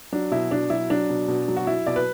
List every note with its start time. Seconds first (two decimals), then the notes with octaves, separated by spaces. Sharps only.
0.12 F#3 D4
0.31 B2 E4
0.51 B2 D4
0.70 F#3 E4
0.90 F#3 D4
1.10 B2
1.28 B2
1.48 F#3
1.56 F#4
1.67 F#3 E4
1.87 B2 D5
1.96 B4